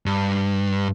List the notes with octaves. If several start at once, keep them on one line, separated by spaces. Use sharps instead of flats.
G2